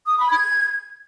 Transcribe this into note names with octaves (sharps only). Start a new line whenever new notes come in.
D#6
B5
G#6